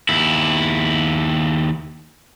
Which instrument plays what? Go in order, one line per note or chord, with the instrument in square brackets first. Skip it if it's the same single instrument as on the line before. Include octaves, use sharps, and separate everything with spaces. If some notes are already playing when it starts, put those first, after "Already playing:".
[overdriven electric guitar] D#2 E4